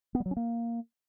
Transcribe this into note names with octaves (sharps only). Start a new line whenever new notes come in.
B3
G3
F#3
C#4
A#3